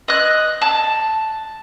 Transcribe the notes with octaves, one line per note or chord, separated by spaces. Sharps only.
D#5 F#6
A5